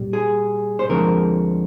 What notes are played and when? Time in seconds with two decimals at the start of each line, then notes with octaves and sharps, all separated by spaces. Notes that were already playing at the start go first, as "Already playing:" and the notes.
Already playing: A#2 G3
0.13 G#4
0.79 C5
0.89 D2 D3 F3 G#3 C4 A#4